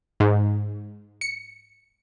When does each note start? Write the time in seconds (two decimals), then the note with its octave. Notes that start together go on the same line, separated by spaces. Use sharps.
0.20 G#2
1.21 C#7